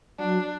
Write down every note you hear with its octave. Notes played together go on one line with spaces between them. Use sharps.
F#3 D4